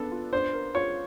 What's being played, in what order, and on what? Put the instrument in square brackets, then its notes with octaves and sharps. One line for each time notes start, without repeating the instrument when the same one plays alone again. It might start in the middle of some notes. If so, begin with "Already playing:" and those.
Already playing: [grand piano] B3 D4 [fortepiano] A4
[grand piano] F4
[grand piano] D4 [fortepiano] C5
[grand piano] A#4
[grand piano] F4 [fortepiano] C#5